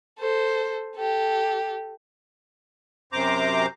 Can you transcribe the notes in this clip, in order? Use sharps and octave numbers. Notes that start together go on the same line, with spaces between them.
A4 C5
G4 A4
F#2 C3 C5 A#5 D6